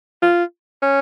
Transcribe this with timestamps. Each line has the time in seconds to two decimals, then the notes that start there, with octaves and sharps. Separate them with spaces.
0.22 F4
0.82 C#4